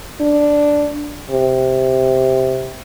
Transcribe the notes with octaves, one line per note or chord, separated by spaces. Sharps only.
D4
C3